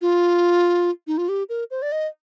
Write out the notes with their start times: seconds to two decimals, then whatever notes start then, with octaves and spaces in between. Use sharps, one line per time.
0.02 F4
1.07 D#4
1.18 F4
1.29 G4
1.49 A#4
1.71 C5
1.82 D5
1.92 D#5